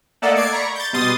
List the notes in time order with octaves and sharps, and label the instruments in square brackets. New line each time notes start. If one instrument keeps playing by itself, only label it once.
[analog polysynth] A3 A#3 A4 D5 D#5 F#5
D5 G#6 C7 D7
A#5 B5 C#6
G6 A6
B2 G3 C6 D#6 A6